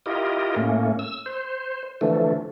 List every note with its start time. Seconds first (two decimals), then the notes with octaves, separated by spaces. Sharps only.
0.06 E4 F4 G4 A#4 D#5
0.56 A2 A3 A#3 C#4
0.99 E6
1.26 C5
2.01 D3 E3 F3 A3